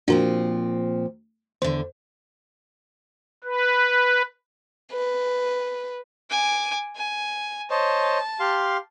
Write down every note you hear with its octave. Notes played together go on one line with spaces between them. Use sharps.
A#2 F3 C4 D4 F#4 A#4
E2 D3 C5
B4
B4
G#5 D6
G#5
C5 C#5 D#5 A5
G4 F5 C6